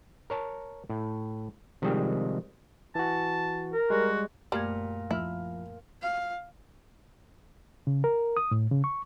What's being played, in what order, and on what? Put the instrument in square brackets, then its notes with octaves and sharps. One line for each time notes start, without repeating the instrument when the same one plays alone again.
[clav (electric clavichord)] A#4 C#5 A5
A2
C3 D#3 F3 G3 G#3 C4
[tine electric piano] E3 F#4 [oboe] A5
[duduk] A#4
[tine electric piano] G3 G#3 [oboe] F#4
[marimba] F#2 A3 G#6 [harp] A#2 A#4 [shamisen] G3
[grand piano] F3 F6 [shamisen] E4
[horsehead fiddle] F5
[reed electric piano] C#3
A#4
D#6
A2
C#3
C#6